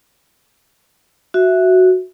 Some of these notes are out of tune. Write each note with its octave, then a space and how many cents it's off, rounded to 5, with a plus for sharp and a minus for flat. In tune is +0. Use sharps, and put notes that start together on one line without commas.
F#4 +0 E5 +0